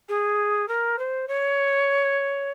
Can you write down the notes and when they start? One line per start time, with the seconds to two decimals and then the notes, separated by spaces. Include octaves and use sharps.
0.08 G#4
0.68 A#4
0.98 C5
1.27 C#5